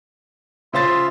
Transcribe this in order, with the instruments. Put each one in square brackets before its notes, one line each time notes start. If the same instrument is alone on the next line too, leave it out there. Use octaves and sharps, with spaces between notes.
[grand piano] C#3 C5 A6 [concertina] F4 E5